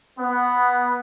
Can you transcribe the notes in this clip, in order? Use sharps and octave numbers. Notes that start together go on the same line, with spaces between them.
B3